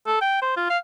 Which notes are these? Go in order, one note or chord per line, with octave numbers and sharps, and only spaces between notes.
A4
G5
C5
F4
F5